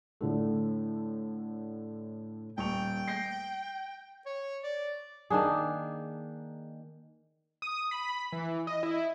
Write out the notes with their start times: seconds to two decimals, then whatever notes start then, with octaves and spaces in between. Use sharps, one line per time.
0.21 A2 D3 A3
2.58 D#1 G5 C#6 F7
3.08 G6 A#6 C7
4.26 C#5
4.64 D5
5.30 D#3 A#3 D4 G#4
7.62 D#6
7.91 B5
8.33 E3
8.67 D#5
8.83 E4